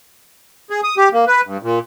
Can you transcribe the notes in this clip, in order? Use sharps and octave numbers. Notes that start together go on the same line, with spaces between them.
G#4
D#6
G4
A#3
B4
G2
A#2